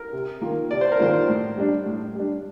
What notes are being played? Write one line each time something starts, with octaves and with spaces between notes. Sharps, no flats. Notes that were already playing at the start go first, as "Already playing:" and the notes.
Already playing: A#4
C3
D#3 A#3 F4
C3 D5
C5
A#4
D#3 A#3 F4 C5
A2
G3 D4
A2
G3 D4